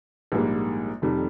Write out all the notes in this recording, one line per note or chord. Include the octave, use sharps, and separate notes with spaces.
A#1 G#2 G3 A#3
F1 F2 D#3 G3